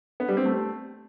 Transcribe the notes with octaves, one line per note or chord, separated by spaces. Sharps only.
B3
G3
C4
A3